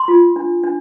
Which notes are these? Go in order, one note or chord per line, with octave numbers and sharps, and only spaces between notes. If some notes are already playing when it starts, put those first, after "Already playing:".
Already playing: C6
F4
D4
D4